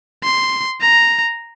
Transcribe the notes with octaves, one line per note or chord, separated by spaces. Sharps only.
C6
A#5